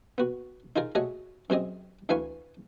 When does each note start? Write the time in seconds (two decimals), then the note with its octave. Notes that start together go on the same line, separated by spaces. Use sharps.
0.18 B3 F#4
0.76 D#4 F4 G#4 A#4
0.95 A3 F#4 G#4 C#5 D#5
1.50 F#2 C4 G#4 D#5
2.09 D2 E3 B4 F5 G#5 C#6